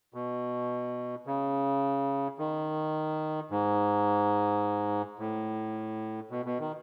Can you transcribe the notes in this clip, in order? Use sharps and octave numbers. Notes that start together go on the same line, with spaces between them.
B2
C#3
D#3
G#2
A2
B2
B2
D#3